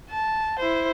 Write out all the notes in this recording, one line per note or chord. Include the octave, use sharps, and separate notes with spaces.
A5
E4 C5